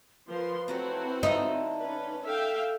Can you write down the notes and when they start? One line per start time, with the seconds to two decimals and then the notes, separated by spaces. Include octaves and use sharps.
0.28 F3 A#4 B4 C6
0.68 F3 F#3 A3 C4 E4 F#4
1.23 D3 D#4 E5 F5
1.78 C#4 B4 D5
2.25 A4 E5 F5 G5